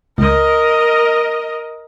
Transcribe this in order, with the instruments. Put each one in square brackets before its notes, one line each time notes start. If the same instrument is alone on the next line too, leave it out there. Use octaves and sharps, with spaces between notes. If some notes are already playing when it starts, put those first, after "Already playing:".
[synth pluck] C#2 [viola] A#4 D#5